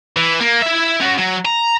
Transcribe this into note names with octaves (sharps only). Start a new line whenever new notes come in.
E3
A#3
E4 E5
C#4 F#4
F#3
A#5